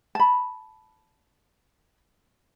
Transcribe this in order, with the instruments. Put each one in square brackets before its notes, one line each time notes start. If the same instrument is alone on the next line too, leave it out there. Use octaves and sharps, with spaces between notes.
[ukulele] A5 B5